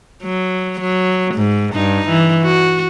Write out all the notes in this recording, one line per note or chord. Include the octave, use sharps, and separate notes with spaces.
F#3
F#3
G#2
G2 D#4
E3
F#4